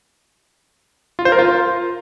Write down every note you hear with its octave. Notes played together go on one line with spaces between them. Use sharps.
F4
C5
A#4
F4